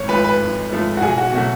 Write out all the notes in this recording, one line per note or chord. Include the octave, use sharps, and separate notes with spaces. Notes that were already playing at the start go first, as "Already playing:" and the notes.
Already playing: G#1 C#5
G#2 F3 A3 B4
B4
G#1
G#2 F3 A3
F#4
B1 G#4
F#4
B2 F#3 A3 F#4